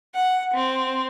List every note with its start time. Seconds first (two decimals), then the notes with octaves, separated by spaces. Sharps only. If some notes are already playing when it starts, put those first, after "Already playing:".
0.15 F#5
0.55 C4